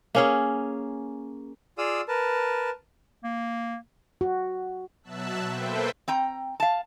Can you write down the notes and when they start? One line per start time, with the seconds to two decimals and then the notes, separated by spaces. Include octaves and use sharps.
0.15 A#3 C#4 G#4
1.78 F4 G#4 D5 F5 D#6 E6
2.08 A#4 B4 A5
3.24 A#3
4.21 F#4
5.03 B2 F#3 E5 A5 E6 F#6
5.50 A#3 A4 B4 C5 E5 G5
6.08 C4 G5 A#5
6.60 F5 A5